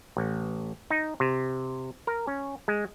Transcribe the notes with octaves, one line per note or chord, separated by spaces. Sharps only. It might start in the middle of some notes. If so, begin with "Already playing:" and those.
A1
D#4
C3
A#4
C#4
G#3